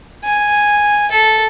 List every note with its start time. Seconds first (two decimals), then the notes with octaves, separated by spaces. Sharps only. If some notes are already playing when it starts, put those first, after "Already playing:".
0.24 G#5
1.11 A4